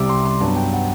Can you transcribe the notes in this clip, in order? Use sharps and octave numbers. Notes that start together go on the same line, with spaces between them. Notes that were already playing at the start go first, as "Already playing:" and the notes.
Already playing: C2 C3 G3 D6 E6
C6
C6
G2 F#3 B3 A5
G5
F#5